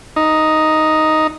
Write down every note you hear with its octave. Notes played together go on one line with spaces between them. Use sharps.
D#4